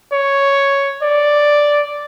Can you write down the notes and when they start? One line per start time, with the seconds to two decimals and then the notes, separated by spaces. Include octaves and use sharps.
0.12 C#5
1.02 D5